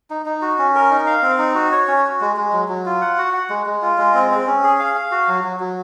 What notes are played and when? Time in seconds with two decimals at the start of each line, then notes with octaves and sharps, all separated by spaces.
0.10 D#4
0.26 D#4
0.42 F#4
0.59 C#4
0.75 A#4
0.90 D#4
1.07 F5
1.23 C4
1.39 D#4
1.55 F#4
1.72 C#5
1.88 C#4
2.04 F#4
2.21 G#3
2.37 G#3
2.53 F#3
2.68 F#3
2.86 F4
3.01 F#5
3.18 F#4
3.34 F#5
3.50 G#3
3.66 G#3
3.82 F4
3.98 G#3
4.14 C4
4.31 C4
4.47 C#4
4.63 G#4
4.80 F5
4.95 F5
5.11 F#4
5.28 F#3
5.44 F#3
5.60 F#3